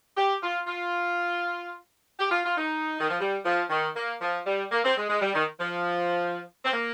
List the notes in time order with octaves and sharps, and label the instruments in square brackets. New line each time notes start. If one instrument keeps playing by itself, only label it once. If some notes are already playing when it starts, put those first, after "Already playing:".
[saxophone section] G4
F4
F4
G4
F4
F4
D#4
D#3
F3
G3
F3
D#3
A#3
F3
G3
A#3
C4
G#3
G#3
G3
D#3
F3
C4
A#3